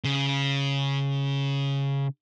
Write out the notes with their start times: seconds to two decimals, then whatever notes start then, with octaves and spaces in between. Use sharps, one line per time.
0.04 C#3